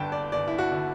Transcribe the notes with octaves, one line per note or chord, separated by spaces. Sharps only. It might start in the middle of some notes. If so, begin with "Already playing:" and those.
Already playing: G1 G2 D3 G5 A5
D5
G1 D5
E4
F#4
D3